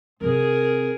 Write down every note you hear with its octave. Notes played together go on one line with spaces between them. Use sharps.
C3 C4 G#4 A#4